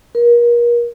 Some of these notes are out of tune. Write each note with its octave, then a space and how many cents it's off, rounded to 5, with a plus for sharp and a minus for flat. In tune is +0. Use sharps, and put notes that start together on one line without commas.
A#4 +35